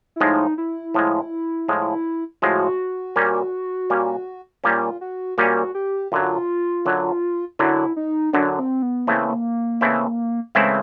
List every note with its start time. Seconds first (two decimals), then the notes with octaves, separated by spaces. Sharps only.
0.16 E4
0.21 A2 F3 G#3 D#4
0.58 E4
0.94 A2 F3 G#3
1.68 A2 F3 G#3
2.42 A2 F3 G#3 F#4
3.16 A#2 G3 A#3 C#4
3.90 A#2 G3 A#3 C#4
4.64 A#2 G3 A#3 C#4 F4
5.01 F#4
5.38 A#2 G3 A#3 C#4 F#4
5.75 G4
6.12 F#2 D3 F#3 F4
6.85 F#2 D3 F#3
7.59 F#2 D3 F#3 E4
7.96 D#4
8.33 F#2 D3 F#3 D4
8.58 C4
8.82 B3
9.07 C#3 E3 A3 A#3 C4 E4
9.81 C#3 E3 A3 C4 E4
10.55 C#3 E3 G#3 A3 C4 E4